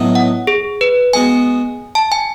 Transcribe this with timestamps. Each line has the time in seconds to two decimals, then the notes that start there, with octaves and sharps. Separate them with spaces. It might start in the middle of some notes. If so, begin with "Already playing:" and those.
Already playing: A2 F#3 B3 D#4
0.15 F#5
0.47 G#4
0.81 B4
1.13 G#3 B3 F#4 G#5
1.95 A5
2.12 G#5